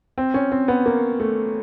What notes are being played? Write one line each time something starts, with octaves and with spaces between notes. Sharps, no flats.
C4
C#4
C4
B3
A#3
A3